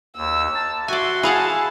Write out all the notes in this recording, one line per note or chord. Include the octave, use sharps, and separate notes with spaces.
D#2 E6
A5
F#4 D5 E5 G#5 C6
E4 G#4 F5 F#5 G#5 A5